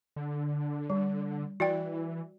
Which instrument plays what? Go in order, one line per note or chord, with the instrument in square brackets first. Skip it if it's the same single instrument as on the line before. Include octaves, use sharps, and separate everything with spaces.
[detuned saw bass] D3
[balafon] G3
[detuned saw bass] E3 [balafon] F#4 D5 G5